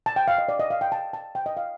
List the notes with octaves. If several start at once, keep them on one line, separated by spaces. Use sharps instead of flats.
A5
G5
F5
D#5
D5
D#5
F5
G5
A5
A5
G5
D#5
F5